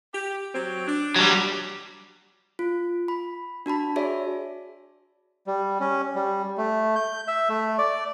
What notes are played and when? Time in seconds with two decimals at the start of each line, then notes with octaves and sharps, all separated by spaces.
0.14 G4
0.54 F#3 C4
0.87 D4
1.16 F#3 G3
2.59 F4
3.08 B5
3.66 D4 F#4 A5 B5
3.96 F#4 G#4 C#5 D5 E5
5.47 G3
5.80 C#4
6.15 G3
6.58 A3
6.96 G6
7.28 E5
7.50 A3
7.79 D5